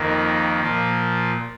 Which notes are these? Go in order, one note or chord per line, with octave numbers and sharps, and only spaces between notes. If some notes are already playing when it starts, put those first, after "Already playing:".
Already playing: F2 D#3 A#3
A#2 F3